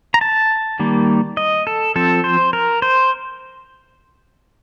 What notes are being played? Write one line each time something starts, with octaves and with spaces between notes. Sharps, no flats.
A#5
A5
D#3 G3 A#3
D#5
A4
F3 C4 A4
C5
A#4
C5